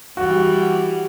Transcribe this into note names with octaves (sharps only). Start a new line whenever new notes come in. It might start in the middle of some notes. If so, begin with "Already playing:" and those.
E3 G3 F#4